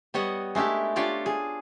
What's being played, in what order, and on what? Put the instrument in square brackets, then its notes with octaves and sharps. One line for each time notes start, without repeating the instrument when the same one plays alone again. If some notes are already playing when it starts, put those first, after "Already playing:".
[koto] G3 B3 C#5 D#5 F#5
G#3 A3 D4 E4 G4
D4 F4 G4 C#5 D5
G#4